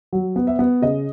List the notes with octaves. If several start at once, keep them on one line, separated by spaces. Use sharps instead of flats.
F#3
B3
E5
B3
C#3 D#5